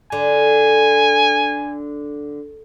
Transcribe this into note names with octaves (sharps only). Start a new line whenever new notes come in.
D3 G#5